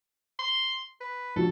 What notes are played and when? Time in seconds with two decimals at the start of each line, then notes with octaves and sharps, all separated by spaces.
0.39 C6
1.01 B4
1.36 A#1 F#4 A4